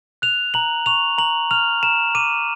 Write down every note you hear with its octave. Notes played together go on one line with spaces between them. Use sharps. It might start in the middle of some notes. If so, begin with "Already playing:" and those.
F#6 F7
A#5 F#7
C#6 F7
A#5 F#7
F6 F7
A#5 E7
D6 D#7